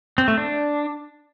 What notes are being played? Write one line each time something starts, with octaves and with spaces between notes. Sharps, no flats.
C4
A3
D4